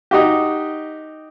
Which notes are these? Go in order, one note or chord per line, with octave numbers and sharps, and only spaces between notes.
D#4 F#4 G4